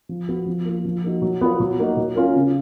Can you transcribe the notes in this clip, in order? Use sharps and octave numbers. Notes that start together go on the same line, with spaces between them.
F3
B3 F#4
F3
A#3 F4
F3
A#3 D#4 F#4
F#3
B3 F4 B4
F#3
A#3 D#4 F#4
F#3
C#4 F4 A#4
C#3